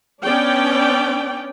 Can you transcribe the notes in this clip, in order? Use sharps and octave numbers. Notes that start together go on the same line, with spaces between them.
B3 C#4 D4 D5 G5